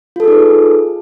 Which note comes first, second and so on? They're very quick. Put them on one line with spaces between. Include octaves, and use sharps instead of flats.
F4 A4 G#4 D#4 B4